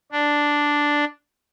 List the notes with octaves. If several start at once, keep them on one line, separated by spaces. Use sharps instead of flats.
D4